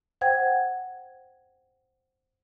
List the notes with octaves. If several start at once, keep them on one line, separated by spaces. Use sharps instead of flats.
C5 F#5 G5 G#6